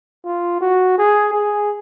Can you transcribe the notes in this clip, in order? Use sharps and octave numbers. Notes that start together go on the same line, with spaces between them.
F4
F#4
G#4
G#4